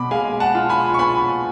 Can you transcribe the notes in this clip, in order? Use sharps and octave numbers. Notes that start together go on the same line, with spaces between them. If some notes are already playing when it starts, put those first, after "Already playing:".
Already playing: B2 B3 B5 D6
G#3 F5 G#5
F#5 A5
F4
G#5 B5
C#6
B3 G#5 B5